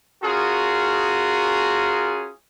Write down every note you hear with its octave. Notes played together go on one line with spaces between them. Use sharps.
C#4 F4 F#4 G#4 A#4